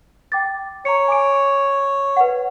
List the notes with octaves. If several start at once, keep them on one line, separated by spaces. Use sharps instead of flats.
G5 D6 A6
C#5 A#5 C#7
G#5 D6 D7
B4 F#5